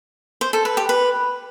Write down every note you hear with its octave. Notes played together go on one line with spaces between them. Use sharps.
C5
A4
B4
G4
B4